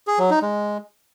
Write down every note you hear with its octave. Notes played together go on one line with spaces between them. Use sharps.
G#4
F#3
D#4
G#3